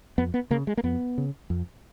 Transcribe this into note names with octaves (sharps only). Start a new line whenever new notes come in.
F2 B3
B3
C#3 A#3
G#3
A#3
F2 B3
C#3
F2